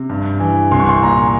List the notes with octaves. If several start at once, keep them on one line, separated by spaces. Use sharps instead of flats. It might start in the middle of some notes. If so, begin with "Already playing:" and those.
Already playing: C3
G2
E3
C2 C6
C#6
C6
A#2 A#5